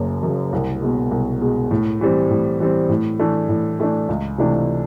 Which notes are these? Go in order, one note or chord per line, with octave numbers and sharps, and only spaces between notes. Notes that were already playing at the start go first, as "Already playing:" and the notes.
Already playing: F#1 F#2 C#3
F#2 C#3
C2
B2 G#3
C2
B2 G#3
A2
E3 G3 C4
A2
E3 G3 C4
A2
E3 A3 D4
A2
E3 A3 D4
C#2
C3 E3 A3 D4